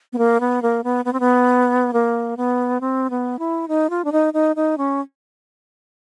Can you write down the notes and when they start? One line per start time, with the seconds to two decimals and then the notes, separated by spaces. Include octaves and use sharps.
0.13 B3
0.18 A#3
0.40 B3
0.62 A#3
0.84 B3
1.05 B3
1.13 C4
1.20 B3
1.93 A#3
2.37 B3
2.81 C4
3.10 B3
3.39 E4
3.68 D#4
3.90 F4
4.05 D4
4.12 D#4
4.34 D#4
4.56 D#4
4.78 C#4